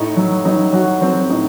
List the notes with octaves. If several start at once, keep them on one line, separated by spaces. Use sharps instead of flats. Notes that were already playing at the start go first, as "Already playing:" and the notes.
Already playing: A2 D#4
F#3
F#3 D#4
F#3 F#4
F#3 C4
A2 D#4